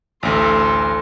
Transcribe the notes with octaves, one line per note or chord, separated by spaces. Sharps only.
A1 D2 A4 C6